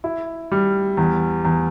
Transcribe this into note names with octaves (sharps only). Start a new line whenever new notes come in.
E4
G3
E2
E2